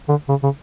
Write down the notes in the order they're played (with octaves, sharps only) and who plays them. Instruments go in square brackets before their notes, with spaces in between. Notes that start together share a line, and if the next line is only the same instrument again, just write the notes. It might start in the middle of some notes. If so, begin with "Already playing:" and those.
[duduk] D3
C#3
C#3